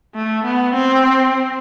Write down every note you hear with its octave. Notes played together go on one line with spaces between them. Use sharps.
A3
B3
C4